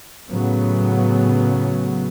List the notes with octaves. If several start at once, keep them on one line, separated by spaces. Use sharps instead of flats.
A2 C#3 F#3 B3